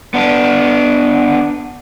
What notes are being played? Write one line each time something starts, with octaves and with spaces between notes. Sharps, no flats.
B3 D4